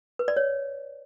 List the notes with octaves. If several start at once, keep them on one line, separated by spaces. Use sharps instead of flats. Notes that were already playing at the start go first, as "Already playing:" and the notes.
B4
D5
C#5